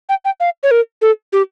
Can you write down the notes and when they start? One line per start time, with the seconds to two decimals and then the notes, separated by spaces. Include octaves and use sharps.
0.09 G5
0.25 G5
0.40 F5
0.63 C#5
0.71 A#4
1.02 A4
1.33 G4